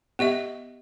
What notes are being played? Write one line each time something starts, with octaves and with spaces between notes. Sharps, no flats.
B3 G4 D#5 E5